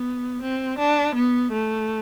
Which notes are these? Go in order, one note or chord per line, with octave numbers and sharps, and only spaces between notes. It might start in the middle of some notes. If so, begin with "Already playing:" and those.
Already playing: B3
C4
D4
B3
A3